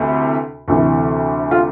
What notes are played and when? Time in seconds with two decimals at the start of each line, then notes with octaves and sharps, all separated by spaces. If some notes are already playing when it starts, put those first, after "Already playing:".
Already playing: D2 C3 E3
0.68 D2 C3 E3
1.51 F4